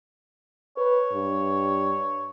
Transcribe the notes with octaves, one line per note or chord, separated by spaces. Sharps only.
B4 C#5
G2